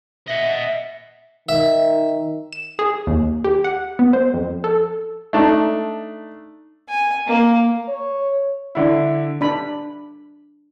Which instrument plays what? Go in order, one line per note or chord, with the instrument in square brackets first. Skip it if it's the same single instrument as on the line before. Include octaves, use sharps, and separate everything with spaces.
[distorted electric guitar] D#5 F#5 [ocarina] E5
[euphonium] D#3 [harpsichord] E5
[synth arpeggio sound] E7
G#4
D#2
G4
F#5
B3
C5
F2
A4
[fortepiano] A3 D4 D#4
[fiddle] G#5
A#3
[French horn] C#5
[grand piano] D3 E4
[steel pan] D4 B5